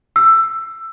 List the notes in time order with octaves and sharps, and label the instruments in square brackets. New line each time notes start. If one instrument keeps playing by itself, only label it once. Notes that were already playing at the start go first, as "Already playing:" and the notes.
[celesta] E6